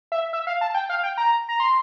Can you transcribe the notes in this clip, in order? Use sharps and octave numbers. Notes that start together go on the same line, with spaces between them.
E5
E5
F5
A5
G5
F5
G5
A#5
A#5
C6